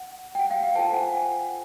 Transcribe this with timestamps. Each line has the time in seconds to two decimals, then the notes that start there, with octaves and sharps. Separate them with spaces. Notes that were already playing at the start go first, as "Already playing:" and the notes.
Already playing: F#5
0.35 G5
0.39 F#5
0.51 F5 G5
0.64 F5 G5
0.75 F4 A4 C5 G5 A5
0.93 F#5 G#5